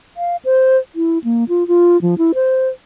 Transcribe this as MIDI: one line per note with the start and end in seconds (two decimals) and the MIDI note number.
0.17 0.36 77
0.45 0.78 72
0.95 1.18 64
1.24 1.44 58
1.49 1.67 65
1.68 2.00 65
2.02 2.15 53
2.18 2.32 64
2.35 2.68 72